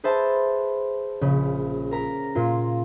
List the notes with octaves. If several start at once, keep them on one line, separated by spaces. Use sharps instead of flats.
G#4 B4 C5 E5 A5
A#1 C#3 C#4
A#4 A#5 B6
A#2 F4